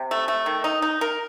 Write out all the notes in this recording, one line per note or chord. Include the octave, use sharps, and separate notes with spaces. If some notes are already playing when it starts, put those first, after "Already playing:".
Already playing: C3
A3
A3
D#3
D#4
D#4
A#4